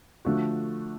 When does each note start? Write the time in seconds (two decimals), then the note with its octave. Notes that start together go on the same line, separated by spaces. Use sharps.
0.25 D3 F3 A3 D4 F#4